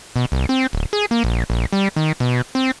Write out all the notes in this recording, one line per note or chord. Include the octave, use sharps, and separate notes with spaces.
B2
C2
C4
D1
G#4
A#3
A#1
A#1
G3
D#3
B2
C4